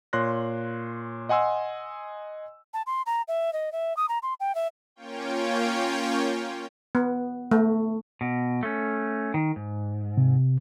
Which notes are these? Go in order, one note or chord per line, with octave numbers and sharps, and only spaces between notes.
A#2 C#5 C6 F#6 A#6
D#5 F#5 G#5 C6 E6
A5
C6
A#5
E5
D#5
E5
D#6
A#5
C6
G5
E5
A#3 C#4 F4 C#5 G5
B3
A3
B2
A3 C#4
D#3
G#2
C3